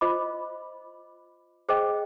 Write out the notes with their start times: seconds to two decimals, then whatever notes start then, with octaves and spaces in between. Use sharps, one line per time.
0.01 F4 C5 D#5 B5 D6
1.69 G#4 C5 D#5 G5 D6